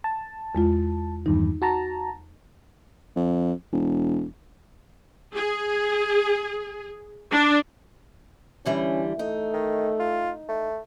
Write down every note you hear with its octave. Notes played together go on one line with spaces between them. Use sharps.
A5
E2 G#3 F4
E2 G2 D#3 D#4
F#4 A5 A#5
F2
E1
G#4
D4
D3 E3 G3 C#4
A3 D#4
D#3
F4
A3